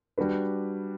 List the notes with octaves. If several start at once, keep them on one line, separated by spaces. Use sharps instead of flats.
G3 D4 F#4 B4